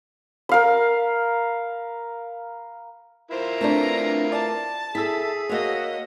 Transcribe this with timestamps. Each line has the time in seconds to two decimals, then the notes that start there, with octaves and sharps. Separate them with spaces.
0.49 A#4 F5 B5
3.31 E4 F4 A#4 C5
3.61 A3 C4 D4 B4 C5 A#5
4.32 D5 A5
4.95 E4 G#4 A4 E6 B6
5.49 A#3 F#4 C#5 D#5